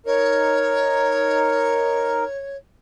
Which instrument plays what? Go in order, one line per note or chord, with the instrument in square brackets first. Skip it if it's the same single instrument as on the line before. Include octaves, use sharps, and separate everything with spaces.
[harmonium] D#4 A#4 [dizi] C#5